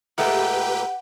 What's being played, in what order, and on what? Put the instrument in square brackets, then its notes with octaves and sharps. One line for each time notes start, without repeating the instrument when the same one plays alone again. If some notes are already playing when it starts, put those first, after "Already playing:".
[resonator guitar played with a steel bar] A#2 G#3 A3 [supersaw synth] G4 B4 G5 [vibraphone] F#5